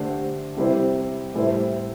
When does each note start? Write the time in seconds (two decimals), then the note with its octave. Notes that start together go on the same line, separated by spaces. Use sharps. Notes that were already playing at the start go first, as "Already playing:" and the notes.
Already playing: D3 A3 D4 G4 C5
0.57 C3 G3 E4 G4 C5
1.33 A2 G3 E4 A4 C5